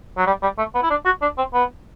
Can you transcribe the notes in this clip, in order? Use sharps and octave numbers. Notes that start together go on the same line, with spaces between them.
F#3
G3
G3
A3
B3
E4
D4
F#4
D4
C4
B3